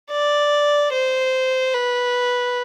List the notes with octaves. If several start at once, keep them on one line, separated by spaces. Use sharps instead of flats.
D5
C5
B4